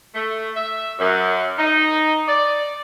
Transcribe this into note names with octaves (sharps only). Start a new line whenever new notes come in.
A3
E5
F#2
D#4
D5